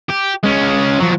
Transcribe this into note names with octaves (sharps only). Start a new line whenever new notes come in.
G4
G#3 C#4
F3 F#3